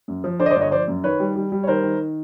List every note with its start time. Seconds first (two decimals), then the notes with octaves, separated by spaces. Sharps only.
0.08 F#2
0.24 F3
0.40 D3 C5 D5
0.46 D#5
0.50 C5 D5
0.56 G1
0.61 C#5 D#5
0.72 F3 C5 D5
0.88 F#2
1.04 D#3 B4 C#5
1.20 G3
1.36 G3
1.52 G3
1.63 C#5
1.67 D#3 A#4 C5
1.84 D#3